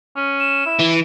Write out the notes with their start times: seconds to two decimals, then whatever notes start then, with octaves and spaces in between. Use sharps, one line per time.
0.16 C#4
0.40 E7
0.66 E4
0.79 E3